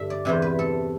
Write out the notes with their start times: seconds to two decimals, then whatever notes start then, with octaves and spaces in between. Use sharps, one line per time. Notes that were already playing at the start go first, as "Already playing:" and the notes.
Already playing: G2 D3 E5
0.10 D5
0.25 E2 C3 E3 C5
0.42 B4
0.59 A4